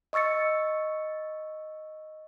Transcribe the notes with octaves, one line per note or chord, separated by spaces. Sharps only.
D#5 C#6 E6 A6 C#7